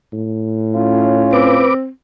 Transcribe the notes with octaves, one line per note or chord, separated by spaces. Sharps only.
A2
C#4 F4
C4 B4 D6